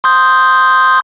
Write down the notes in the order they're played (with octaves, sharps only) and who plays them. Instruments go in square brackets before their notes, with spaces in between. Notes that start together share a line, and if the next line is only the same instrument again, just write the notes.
[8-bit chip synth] C6 D#6 G6